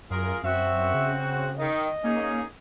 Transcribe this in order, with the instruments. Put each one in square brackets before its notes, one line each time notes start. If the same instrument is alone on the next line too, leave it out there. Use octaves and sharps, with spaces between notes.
[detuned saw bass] F#2 [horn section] F4 G#4 A#4
[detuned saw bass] F#2 [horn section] C4 F#4 [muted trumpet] E5
[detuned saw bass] C#3
[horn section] D#3 [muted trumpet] D#5
[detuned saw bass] A#3 [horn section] C#4 D#4 G#4